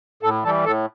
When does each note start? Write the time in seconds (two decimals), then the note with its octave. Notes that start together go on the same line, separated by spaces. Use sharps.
0.23 A2 A4
0.44 E3 G3 A4
0.65 A2 A4